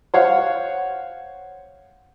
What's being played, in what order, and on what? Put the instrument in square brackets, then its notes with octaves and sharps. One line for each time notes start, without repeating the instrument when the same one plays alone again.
[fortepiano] C5 C#5 F5 F#5